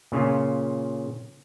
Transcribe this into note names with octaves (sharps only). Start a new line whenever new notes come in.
A#2 C#3 C#4 F4